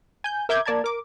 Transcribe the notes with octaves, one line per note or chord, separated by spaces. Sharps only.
G#5 G6
A#4 E5 D6 G6 G#6
A#3 D5 A5 A#5 G#6
A#4 D6